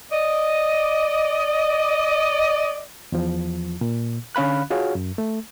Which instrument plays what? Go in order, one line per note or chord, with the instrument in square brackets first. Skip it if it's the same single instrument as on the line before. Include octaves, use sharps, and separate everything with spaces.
[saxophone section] D5 D#5
[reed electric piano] E2 F3
A#2
D3 C#4 F5 B5 F#6
F4 F#4 G#4 C#5 F5
F#2
A3